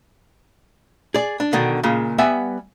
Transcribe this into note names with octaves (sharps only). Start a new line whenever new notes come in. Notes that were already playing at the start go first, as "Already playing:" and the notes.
G#4 D5
D4
B2 D3 D#3 D4
A#2 C#3 G#3
G3 B3 E5 F#5 G#5